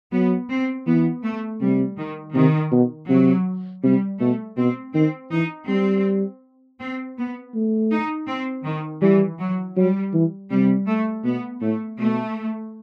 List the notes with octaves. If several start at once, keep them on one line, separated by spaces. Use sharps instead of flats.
F#3 B3
C4
E3 B3
A3
C3 G3
D#3
C3 D#3
B2
C3 F#3
C3 G3
B2 A3
B2 C4
D#3 C4
E3 D#4
G3 C4
C4
B3
A3
D#4
C4
D#3
E3 G3
F#3
F#3 G3
E3
C3 G3
A3
B2 B3
A2 A3
B2 A3